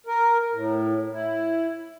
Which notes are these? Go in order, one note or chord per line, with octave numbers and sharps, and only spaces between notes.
A#4
A2
E4